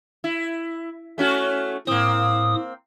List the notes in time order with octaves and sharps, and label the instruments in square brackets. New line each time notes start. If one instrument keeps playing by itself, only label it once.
[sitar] E4
A3 C#4 F#4
[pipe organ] A2 D#6 [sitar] A#3 C4